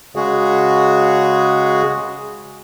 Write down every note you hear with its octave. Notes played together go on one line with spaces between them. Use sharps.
C#3 G#3 F#4 G#4